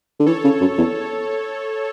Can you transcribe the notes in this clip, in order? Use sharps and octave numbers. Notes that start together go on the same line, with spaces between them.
D3
E3 A4 C#5
C#3
F#2
E2